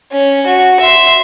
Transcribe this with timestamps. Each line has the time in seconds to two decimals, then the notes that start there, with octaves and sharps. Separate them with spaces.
0.12 C#4
0.46 F#4
0.80 E5 C6